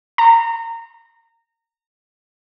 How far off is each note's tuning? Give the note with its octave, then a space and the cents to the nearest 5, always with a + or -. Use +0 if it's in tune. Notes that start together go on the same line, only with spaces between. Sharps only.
A#5 -25